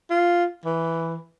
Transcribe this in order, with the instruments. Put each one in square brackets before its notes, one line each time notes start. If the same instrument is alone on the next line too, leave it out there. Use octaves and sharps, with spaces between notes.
[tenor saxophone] F4
E3